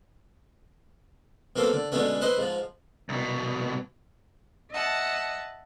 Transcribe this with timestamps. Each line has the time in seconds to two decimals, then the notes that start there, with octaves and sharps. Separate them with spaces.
1.56 B2 F#3 A#3 C4 A4 F5
1.73 D3
1.92 B2 D3 G#3 A3 B3 C#4
2.21 E4 B4 C5 D#5
2.38 G#2 F3
3.09 C2 B2
4.72 D#5 E5 F#5 A5